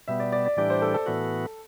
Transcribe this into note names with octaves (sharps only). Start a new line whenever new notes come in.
B2 G3 B3 E5
D5
D5
D5
A2 E3 G3 D4 G4 D5
C5
A4
A4
A2 E3 B3 F#4